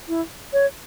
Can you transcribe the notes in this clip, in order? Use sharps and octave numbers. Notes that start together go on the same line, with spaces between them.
E4
C#5